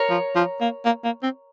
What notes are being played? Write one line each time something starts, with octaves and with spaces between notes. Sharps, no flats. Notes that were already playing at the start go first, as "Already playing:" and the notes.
Already playing: A#4 C#5
F3
F3
A#3
A#3
A#3
C4